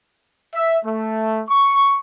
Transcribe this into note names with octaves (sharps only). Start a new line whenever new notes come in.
E5
A3
C#6